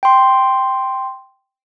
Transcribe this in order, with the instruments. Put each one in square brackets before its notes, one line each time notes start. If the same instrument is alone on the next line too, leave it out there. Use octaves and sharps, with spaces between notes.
[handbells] G5 C6